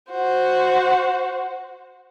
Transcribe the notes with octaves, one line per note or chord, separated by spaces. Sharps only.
F#4 C5